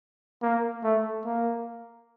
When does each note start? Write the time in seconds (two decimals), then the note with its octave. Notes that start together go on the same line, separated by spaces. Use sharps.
0.42 A#3
0.84 A3
1.25 A#3